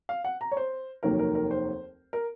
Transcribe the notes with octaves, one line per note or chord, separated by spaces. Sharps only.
F5
F#5
A#5
C#5
C5
F1 D#2 D#3 F#3 A#3 A#4
A#4
A#4
C5
A#4